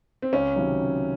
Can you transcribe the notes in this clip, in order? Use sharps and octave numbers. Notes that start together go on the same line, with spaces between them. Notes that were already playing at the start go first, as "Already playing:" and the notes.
C4
C#2 C#4
C3 D#3 F#3
C#2